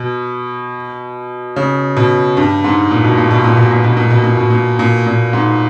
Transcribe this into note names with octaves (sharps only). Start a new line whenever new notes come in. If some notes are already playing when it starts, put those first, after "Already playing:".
Already playing: B2
C#3
B2
G2
G#2
A#2
B2
A#2
B2
A#2
B2
A#2
B2
A#2
B2
A#2
B2
A#2
A#2
A#2
G#2